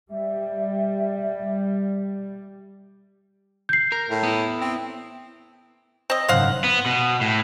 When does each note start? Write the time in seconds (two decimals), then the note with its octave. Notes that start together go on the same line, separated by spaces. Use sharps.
0.11 G3 E5
3.69 G6 C7
3.92 A#4
4.10 A2
4.23 B3 E4
4.61 C4
6.10 C4 D#5
6.28 F#1 G#2 C#3 C5 F5 F#5
6.64 B3
6.86 B2
7.21 A2